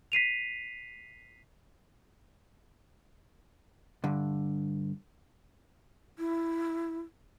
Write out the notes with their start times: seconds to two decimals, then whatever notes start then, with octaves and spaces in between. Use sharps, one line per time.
0.12 B6 C7 D#7 F7
4.04 G2 D3
6.18 E4